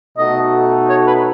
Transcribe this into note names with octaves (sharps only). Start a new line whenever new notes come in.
B2 A3 D#4 F#4 A4 D#5
C#5
B4